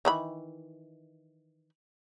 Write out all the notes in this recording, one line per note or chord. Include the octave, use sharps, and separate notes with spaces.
D#3 E3 B5